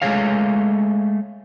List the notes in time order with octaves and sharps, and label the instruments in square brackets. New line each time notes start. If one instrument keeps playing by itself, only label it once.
[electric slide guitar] G#3 A3 G#4 C#5 F5